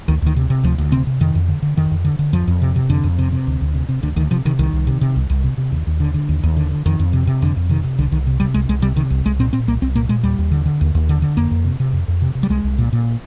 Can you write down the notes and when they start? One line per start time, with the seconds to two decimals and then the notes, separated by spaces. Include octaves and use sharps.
0.08 D2 D#3
0.22 D2 D#3
0.36 C3
0.50 C3
0.64 D2 F3
0.78 D2
0.92 C3 C4
1.07 C3
1.20 F2 D#3
1.35 F2
1.48 D3
1.62 D3
1.77 F2 D#3
1.91 F2
2.05 D3
2.19 D3
2.33 F2 F3
2.47 F2
2.62 C3
2.76 C3
2.89 F2 D3
3.04 F2
3.18 C3
3.32 C3
3.47 D2
3.61 D2
3.74 C3
3.89 C3
4.03 D2 D3
4.16 D2 D#3
4.31 C3 F3
4.45 C3 D#3
4.59 C2 D#3
4.73 C2
4.87 C3
5.01 C3
5.16 C2
5.30 C2
5.44 C3
5.58 C3
5.72 D#2
5.87 D#2
6.00 D3
6.14 D3
6.29 D#2
6.43 D#2
6.57 D3
6.71 D3
6.86 F2 D#3
7.00 F2
7.13 C3
7.27 C3
7.42 F2 D3
7.56 F2
7.69 C3 D#3
7.83 C3
7.99 C2 D3
8.11 C2 D#3
8.27 C3
8.40 C3 G3
8.54 C2 G#3
8.69 C2 G#3
8.82 C3 G3
8.96 C3 D#3
9.10 C2
9.25 C2 G#3
9.39 A#2 C4
9.53 A#2 C4
9.68 C2 A#3
9.82 C2 C4
9.95 A#2 A#3
10.09 A#2 G#3
10.24 D#2 G3
10.38 D#2
10.52 D3
10.66 D3
10.81 D#2
10.95 D#2
11.09 D3
11.22 D3
11.37 F2 A#3
11.51 F2
11.65 C3
11.80 C3
11.93 F2
12.08 F2
12.22 C3
12.35 C3
12.43 G3
12.50 C2 G#3
12.64 C2
12.78 A#2
12.93 A#2